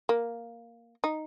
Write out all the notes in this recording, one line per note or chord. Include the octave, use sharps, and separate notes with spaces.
A#3
D#4